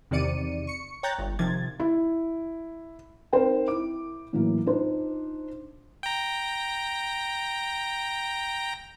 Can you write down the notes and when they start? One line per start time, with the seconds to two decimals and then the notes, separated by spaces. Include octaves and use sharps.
0.11 E2 C3 D#3 D5 C#7 D#7
0.67 C#6 C#7
1.03 C#5 G5 A#5 F#6 G6 A6
1.19 G1
1.39 C3 D#3 F3 G#6 A6
1.80 E4
3.33 C4 D#4 A#4 C5 G5
3.68 E4 D6
4.33 A2 E3 F#3 A#3
4.66 D4 D#4 F4 C5
6.03 G5 A#5